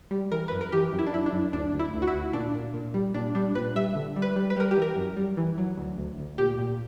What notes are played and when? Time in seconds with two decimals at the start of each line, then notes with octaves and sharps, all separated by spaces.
0.11 G3
0.31 E3 A#4
0.48 F#2 B4
0.61 A#4
0.72 E3 G4
0.93 F#2
0.99 E4
1.06 D4
1.13 F#2 E4
1.26 D4
1.33 F#2
1.53 D2 D4
1.74 D2
1.79 E4
1.94 D2
2.02 F#4
2.07 E4
2.13 D2
2.33 A#2 D4
2.54 A#2
2.74 A#2
2.94 G3
3.14 A#2 D4
3.35 G3 D4
3.55 A#2 B4
3.76 G3 E5
3.95 D3
4.16 G3
4.22 B4
4.36 G3
4.50 B4
4.56 G3 A#4
4.71 G4
4.77 E3
4.82 A#4
4.97 F#2
5.17 G3
5.37 E3
5.58 F#3
5.77 D2
5.98 D2
6.18 D2
6.38 A#2 G4
6.59 A#2